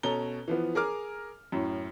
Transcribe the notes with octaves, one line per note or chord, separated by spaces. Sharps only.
B2 C#4 A4 A#5 G7
E3 F3 B3
G#4 A#4 D6 F6
F#2 A2